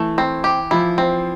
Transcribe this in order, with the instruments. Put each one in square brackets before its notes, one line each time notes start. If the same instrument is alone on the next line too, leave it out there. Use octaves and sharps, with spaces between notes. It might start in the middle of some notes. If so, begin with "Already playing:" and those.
Already playing: [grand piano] E3 [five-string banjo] A3
[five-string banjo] C4
G4
[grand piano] F3 [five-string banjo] E4
[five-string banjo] C4